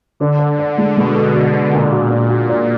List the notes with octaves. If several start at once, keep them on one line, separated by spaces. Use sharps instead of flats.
D3 D4
D5
D5
G#3
B2 G#3
F#4
F#4
D5
A#2 D4
F#4
D4
F#4
D5